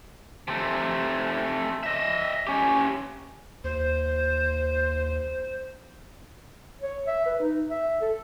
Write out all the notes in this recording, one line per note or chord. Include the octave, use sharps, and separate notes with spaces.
C3 A3
D#5 E5
C#4 G4
D#2 C5
C#5
E5
B4
D#4
E5
A4